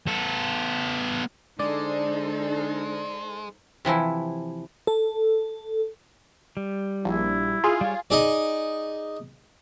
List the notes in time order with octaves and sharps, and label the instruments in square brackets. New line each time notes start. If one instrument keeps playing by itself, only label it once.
[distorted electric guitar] B3 A4
[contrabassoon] D3 [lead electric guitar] G#3 [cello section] D#4 A4 C5 [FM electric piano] D5
[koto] C3 E3 F3 E4
[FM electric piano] A4
[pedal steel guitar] G3
[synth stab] A#1 [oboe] E4
[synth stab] F4 G#4
[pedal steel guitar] G3 C#5
[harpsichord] D#4 G#4 D5